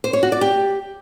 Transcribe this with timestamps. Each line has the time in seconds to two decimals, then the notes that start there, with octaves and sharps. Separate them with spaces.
0.04 C5
0.13 C#5
0.23 F#4
0.32 D5
0.41 G4